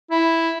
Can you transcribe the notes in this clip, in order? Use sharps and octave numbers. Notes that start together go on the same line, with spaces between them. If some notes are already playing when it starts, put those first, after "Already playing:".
E4